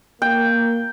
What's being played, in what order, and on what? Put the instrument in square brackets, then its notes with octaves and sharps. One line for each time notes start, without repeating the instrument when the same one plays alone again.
[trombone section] A#3 [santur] G5